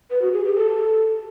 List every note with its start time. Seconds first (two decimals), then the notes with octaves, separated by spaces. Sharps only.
0.11 B4
0.22 F#4
0.33 G#4
0.44 G4
0.55 A4